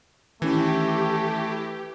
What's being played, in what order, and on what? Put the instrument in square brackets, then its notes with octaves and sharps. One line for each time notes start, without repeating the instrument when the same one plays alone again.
[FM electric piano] D#3 C#4 E4 [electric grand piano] E3 [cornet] A3 [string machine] G4